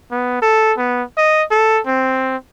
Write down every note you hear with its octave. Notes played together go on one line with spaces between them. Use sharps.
B3
A4
B3
D#5
A4
C4